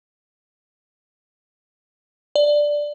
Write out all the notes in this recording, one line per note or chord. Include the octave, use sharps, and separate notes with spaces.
D5